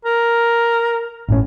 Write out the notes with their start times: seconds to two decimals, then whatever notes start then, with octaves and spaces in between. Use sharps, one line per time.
0.05 A#4
1.28 G#1 A2 C#4